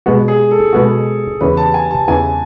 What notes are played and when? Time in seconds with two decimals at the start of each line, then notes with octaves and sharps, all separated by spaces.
0.06 B2 G#3 B3 F#4
0.28 G#4
0.51 A4
0.73 B2 G#3 B3 F#4
1.41 E2 C#3 E3 B4
1.57 A5
1.74 G#5
1.91 A5
2.08 E2 C#3 E3 G#5